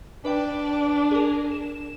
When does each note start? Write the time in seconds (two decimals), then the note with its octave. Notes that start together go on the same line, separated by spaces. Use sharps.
0.25 D4 B4 D5 G5
1.11 G#4 A#4
1.52 E7